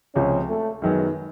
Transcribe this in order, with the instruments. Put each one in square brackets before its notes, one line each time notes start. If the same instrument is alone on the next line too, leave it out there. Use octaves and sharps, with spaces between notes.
[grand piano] C#2 C3 F3 [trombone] C#4
[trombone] A3
[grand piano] F#2 D#3 F#3 B3 [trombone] G#3